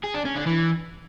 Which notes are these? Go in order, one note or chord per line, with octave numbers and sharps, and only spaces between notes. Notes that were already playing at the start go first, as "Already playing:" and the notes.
G#4
D4
C#4
D3
E3